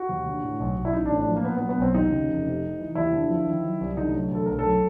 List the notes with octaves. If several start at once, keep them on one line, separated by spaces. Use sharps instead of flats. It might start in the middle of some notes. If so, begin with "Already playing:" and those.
Already playing: F#4
D#2
D3
A2
B1
B1
E4
A1 D#4
D4
A2
D4
F3
A#3
A#2 B3
B3
F#3
B3
B1 C4
D#2 D#4
C#3
F1
C3
C3
E3
D#2 E4
D3
F3
D#3
F#3
C2
D2 D#4
F#3
D2 A4
B1 A#4
A4
F#3